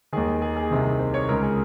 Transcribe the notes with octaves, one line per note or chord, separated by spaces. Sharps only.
D#2 D#3 G#4
G#4
G#4
C2 C3 D#3
C5
C#5
C#2 C#3 A#4
G#4